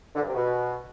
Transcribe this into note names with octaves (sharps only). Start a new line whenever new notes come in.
D3
G2
C3
B2